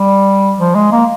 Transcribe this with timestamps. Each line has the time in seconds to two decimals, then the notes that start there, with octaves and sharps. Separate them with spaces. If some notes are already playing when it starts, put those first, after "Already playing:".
Already playing: G3
0.59 F3
0.75 G#3
0.92 A#3